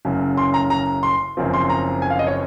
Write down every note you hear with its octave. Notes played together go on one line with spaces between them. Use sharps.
F#1 F#2 C#3 F#3
C6
A#5
A#5
C6
F#1 F#2 F3 C4
C6
A#5
G#5
F5
D#5
C#5